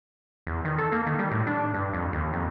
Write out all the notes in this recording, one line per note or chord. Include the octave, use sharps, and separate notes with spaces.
E2
D#3
A4
A#3
D#3
G3
A2
D4
G2
F2
D#2
F2